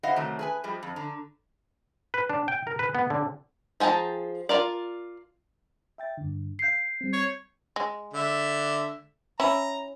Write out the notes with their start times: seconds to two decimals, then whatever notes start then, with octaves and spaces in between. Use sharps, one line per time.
0.03 E4 C5 D#5 F5 F#5
0.16 C3 D#3 F#3 A3
0.39 G#4 B4 G#5
0.64 F3 G3 G#3
0.83 F2
0.96 D3 A#5
2.14 B4
2.30 D4
2.48 G5
2.67 A#4
2.79 B4
2.95 B3
3.10 D3
3.80 F3 G#4 G5 A5 A#5
4.49 F4 A#4 D5
5.98 E5 G5 A6
6.18 G2 D3
6.59 F5 G6 C7 C#7
7.01 G3 C4
7.13 C#5
7.76 G#3
8.14 D3 E5
9.40 C#4 E4 A#5